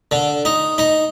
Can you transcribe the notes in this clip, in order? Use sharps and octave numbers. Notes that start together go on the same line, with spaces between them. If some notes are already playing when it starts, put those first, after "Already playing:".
D3
D#4
D#4